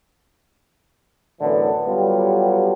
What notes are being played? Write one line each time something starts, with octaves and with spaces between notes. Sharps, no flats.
F#2 A2 D3 E3 B3 D4
F#3 G3 B3 F4 G4 A4